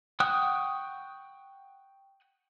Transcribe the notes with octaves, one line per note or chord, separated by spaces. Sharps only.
F#5 G5 C#6 D#6 F#6